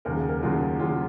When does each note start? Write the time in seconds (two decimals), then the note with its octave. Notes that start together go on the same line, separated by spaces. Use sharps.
0.05 D#2 C#3 F#3 A#4
0.17 G#4
0.29 A#4
0.43 D#2 C#3 F#3 F4
0.79 D#2 C#3 F#3 F4